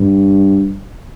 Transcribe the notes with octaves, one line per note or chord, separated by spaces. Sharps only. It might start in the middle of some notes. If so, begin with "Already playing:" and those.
Already playing: G2